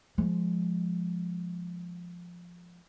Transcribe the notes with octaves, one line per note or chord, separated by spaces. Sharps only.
F3 G#3